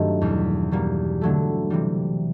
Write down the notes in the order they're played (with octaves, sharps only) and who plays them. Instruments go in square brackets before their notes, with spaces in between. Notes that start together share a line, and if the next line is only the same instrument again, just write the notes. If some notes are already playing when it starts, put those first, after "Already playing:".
Already playing: [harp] G2 D#3 F#3 A3 C4
E2 B2 G3
B2 G3 A#3
D3 F#3 A3
C3 E3 G3